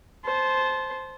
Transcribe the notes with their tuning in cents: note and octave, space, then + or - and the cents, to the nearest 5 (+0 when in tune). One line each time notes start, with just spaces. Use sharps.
C5 +0 A5 -25